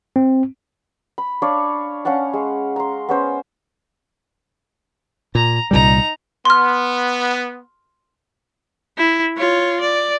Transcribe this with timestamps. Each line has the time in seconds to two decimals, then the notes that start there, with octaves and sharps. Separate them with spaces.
0.16 C4
1.18 B5
1.42 D4 C#5 D5 F5
2.05 C#4 F5 F#5 A5
2.33 G#3
2.76 A#5 C6
3.09 B3 C#4 C5
5.35 A#2 A#5
5.71 C2 A#2 G3 D#4 A#5
6.45 B3 C6 F6
8.98 E4
9.38 F4 C#5
9.80 D5